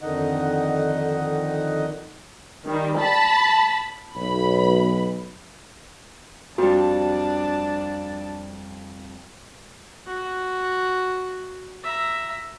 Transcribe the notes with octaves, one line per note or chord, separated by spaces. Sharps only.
F2 D3 D#3 D#4 D#5 F#5
D#3 G3
A5 B5
B1 B5
F2 G3 D4 F#4 A5
F#4
E5 A#5